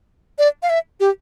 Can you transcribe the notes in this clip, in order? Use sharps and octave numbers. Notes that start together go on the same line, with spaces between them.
D5
F5
E5
G4